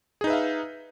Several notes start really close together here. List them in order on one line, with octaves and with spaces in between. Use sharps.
G#4 D#4 B4 E5 F5